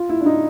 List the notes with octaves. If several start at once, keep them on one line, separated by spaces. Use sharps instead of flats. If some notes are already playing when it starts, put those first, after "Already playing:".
Already playing: F4
E4
D4
D#4